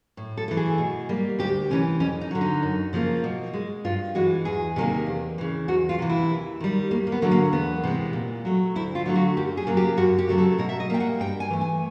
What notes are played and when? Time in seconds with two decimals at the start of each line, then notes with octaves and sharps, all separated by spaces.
0.17 A2
0.37 A4
0.48 E3 A3
0.57 G#4
0.78 B2
1.09 G3 A#3
1.39 D2 G4
1.70 C3 E3 C#4
2.00 F2 C#4
2.21 D#4
2.31 D3 F#3
2.41 D#4
2.62 F#2
2.93 C#3 F3 A#3
3.24 B2
3.54 G#3
3.84 G2 F4
4.15 E3 G#3 F#4
4.45 E2 G#4
4.76 C3 D#3 G3 A#3
5.07 E2
5.38 C#3 E3
5.68 E2 F#4
5.89 F4
5.99 C3 E3
6.10 E4
6.30 D#2
6.61 D#3 G3
6.91 D#2 A#3
7.07 A#3
7.12 B3
7.22 D3 F#3 A3
7.31 A#3
7.52 E2 B3
7.83 C3 E3 G#3
8.13 A#2
8.45 F#3 A3
8.75 D2 E4
8.95 F4
9.06 D3 F#3 A3
9.16 F#4
9.37 F#2 G4
9.57 G#4
9.67 C#3 F#3 A#3
9.77 G4
9.97 F#2 F#4
10.18 G4
10.29 C#3 F#3 A3
10.38 A4
10.58 B2 A#4
10.69 E5
10.80 D#5
10.90 G3 A#3 G5
11.00 F#5
11.20 G2 G5
11.40 G#5
11.50 E3 A3
11.61 G#5